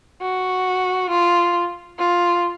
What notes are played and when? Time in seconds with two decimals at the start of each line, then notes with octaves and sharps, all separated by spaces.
0.21 F#4
1.10 F4
1.99 F4